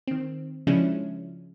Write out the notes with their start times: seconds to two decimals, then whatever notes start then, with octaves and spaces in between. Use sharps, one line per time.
0.07 D#3 C4
0.67 C#3 F3 G#3 C#4 D4 E4